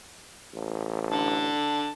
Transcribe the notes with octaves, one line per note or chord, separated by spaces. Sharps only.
A1
D3 A5